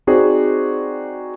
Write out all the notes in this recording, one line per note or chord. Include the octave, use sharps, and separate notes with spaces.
C4 D#4 F#4 G#4 C5 D5